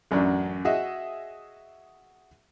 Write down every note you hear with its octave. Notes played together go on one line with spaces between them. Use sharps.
A1 F#2 F#3 D4 F#4
F#4 G#4 D#5 E5